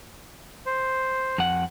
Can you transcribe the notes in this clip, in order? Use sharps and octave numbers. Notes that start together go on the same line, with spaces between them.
C5
F2 F#5